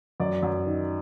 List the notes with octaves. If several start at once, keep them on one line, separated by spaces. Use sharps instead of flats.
F#2 D5
F#2
D#3